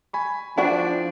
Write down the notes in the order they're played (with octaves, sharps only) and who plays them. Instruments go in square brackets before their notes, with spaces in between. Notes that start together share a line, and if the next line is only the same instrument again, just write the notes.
[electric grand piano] G#5 B5 C#6
[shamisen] D3 E3 F#4 [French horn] F3 [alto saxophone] D4 [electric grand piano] G5